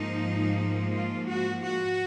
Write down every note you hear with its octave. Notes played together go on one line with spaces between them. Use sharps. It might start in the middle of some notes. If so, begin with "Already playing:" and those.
Already playing: G#2 F3 A#3 D#4
F4
F#4
F#4